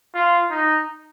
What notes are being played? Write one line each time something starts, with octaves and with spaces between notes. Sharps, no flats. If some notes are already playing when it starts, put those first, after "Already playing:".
F4
D#4